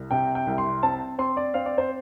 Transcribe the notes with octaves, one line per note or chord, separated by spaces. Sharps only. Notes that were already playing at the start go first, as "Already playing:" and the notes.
Already playing: C2
C3 G5
G5
C2
C6
C4 A5
C4 C6
D5
C4 F5
D5
C5